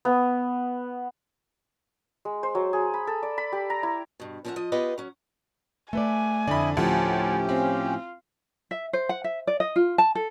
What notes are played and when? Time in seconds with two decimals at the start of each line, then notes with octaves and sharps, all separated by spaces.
0.05 B3
2.25 G#3
2.43 C5
2.55 F#3
2.73 G#4
2.94 B5
3.07 A4
3.23 D5
3.38 B5
3.53 G4
3.70 A#5
3.83 E4
4.20 G2 B2
4.45 F3 C#4 A#4 D5 E5 F#5
4.56 F3 D#5
4.72 B3 F4 G4 B4 D#5
4.98 F#3 C#4
5.93 A3 B4 D5 G#5
6.47 F2 D3 E4 D5 D#5 B5
6.77 D2 A2 F3 C#4 E4 G4 A5
7.49 C4 F4
8.71 E5
8.93 C5
9.09 F#5
9.24 E5
9.47 D5
9.60 D#5
9.76 F4
9.98 A5
10.15 A4